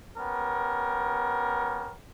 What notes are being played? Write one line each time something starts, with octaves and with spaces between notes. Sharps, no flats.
B3 C#4 G4 A#4